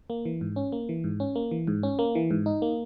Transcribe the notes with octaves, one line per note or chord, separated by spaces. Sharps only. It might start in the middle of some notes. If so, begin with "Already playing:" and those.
A#3
E3
G#2
C#4
A#3
E3
G#2
C#4
A#3
E3
G#2
C#4
A#3
E3
G#2
D#4
A#3